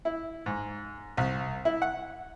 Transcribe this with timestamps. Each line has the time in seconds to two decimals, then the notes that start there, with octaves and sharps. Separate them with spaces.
0.05 E4
0.46 G#2
1.17 C2
1.65 E4
1.82 F#5